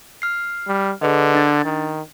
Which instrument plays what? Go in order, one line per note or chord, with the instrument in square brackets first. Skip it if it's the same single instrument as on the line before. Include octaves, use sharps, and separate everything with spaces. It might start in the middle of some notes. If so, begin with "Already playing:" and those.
[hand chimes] F6 C7
[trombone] G3
[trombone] D3 [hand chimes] G#4 B4 D#5
[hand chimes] D4 A6
[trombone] D#3